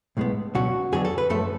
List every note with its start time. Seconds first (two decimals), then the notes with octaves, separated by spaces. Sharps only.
0.17 B1 A2 G#3 B3
0.55 C#2 B2 F#3 C#4 F#4
0.92 F2 D3 F#3 B3 G#4
1.05 A4
1.18 B4
1.30 F#2 F3 A3 A4